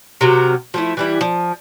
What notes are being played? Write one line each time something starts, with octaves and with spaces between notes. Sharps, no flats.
C3 F#3 A#4
F3 A3 E4
E3 G3 E4
F3